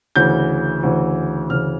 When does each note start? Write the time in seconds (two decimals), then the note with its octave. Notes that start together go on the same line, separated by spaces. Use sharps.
0.16 D2 C#3 E3 G6
0.83 D2 C#3 E3
1.50 D2 C#3 E3 F6